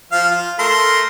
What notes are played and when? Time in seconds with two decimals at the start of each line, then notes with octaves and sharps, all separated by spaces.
0.12 F3 F5
0.31 F4
0.59 A3 A#4 C6